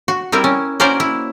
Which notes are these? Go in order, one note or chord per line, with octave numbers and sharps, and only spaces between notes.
F#4
G3 C4 E4 A#4
C#4
A#3 C#4 F#4 A#4 C5 D5
E4